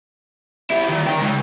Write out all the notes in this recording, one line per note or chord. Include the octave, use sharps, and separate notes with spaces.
E4 G4
A#2 D#3
D#4 G5
C#3 G#3